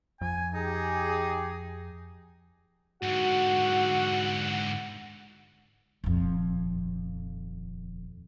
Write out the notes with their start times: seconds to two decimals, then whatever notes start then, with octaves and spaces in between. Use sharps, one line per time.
0.21 F2 G#5
0.54 D#4 G4 G#4
3.02 G#2 D3 F#4 F#5
6.04 D#1 F2